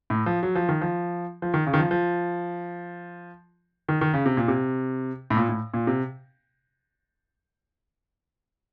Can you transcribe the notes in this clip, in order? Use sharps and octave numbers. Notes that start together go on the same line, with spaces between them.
A2
F3
F#3
F3
D#3
F3
F3
D#3
C#3
D#3
F3
F3
D#3
D#3
C#3
C3
A#2
C3
A2
A#2
A2
A#2
C3